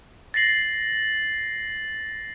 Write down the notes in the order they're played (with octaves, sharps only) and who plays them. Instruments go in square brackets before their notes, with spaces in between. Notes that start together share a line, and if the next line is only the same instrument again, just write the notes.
[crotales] A6 A#6 C7 F#7